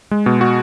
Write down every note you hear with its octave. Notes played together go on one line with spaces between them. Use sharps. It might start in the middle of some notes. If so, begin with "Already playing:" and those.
G#3
B2
F#4